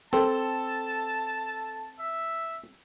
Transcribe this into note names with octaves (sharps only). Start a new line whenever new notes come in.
C4 A4 A5
E5